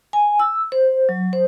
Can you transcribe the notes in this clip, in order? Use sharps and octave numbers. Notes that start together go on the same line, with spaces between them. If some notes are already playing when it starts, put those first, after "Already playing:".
G#5
E6
C5
F#3
C5